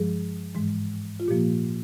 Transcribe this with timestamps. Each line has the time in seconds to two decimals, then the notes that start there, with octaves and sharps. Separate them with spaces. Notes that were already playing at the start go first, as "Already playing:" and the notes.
Already playing: G2 F3 G#3 G#4
0.55 G#2 E3 G#3
1.20 F4
1.28 A#2 F3 A#3 G4